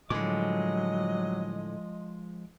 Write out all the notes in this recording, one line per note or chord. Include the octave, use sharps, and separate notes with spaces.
A2 D3 F3 F#3 G#3 D#5 D6